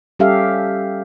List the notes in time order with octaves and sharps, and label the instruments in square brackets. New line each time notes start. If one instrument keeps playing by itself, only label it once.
[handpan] G3 C#4 G4 A4 E5 F5